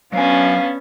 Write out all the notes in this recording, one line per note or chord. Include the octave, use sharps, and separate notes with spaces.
F#3 B3 C#4 D4 F5 G#5